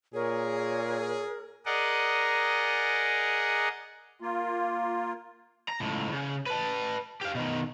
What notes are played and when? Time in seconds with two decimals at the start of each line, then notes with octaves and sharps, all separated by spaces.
0.14 A#2 G#4 A#4 C#5
1.66 G#4 A#4 D5 D#5 F#5
4.20 A#3 F4
5.69 A#5
5.80 C#2 A2
6.12 C#3
6.46 B4 A5
7.21 G4 F5
7.35 B2 D#3